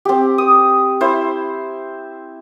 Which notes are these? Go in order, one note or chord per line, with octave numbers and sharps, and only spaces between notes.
C4 G4
D#6
E4 C5